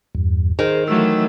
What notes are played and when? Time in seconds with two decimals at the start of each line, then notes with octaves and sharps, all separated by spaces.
0.15 E2 G2
0.59 D#3 G#4 A#4 C5
0.88 E3 F#3 A3 E6